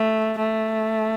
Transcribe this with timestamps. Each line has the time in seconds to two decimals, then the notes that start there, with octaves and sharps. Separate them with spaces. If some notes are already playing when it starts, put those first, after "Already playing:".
Already playing: A3
0.38 A3